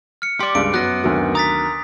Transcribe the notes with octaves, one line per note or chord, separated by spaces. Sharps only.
F6 C#7
G4 D5 C6 D6
C#2 G2 D7
F#2 F#3 B3 F#6 A#6
D2 D#3 F#3
A#5 D#6 A6 B6